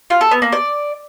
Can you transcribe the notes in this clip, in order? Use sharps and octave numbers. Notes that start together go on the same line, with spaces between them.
F4
A4
B3
A#3
D5